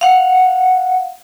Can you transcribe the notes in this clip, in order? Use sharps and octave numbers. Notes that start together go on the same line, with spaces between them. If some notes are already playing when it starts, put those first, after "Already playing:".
F5 F#5